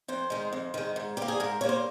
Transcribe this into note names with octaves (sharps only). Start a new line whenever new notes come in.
F2 C5
D#3 G#3
F2
D#3 G#3
G#2
G3 A#3 G4
G#4
G#2 A#4
G3 A#3 C#5
C5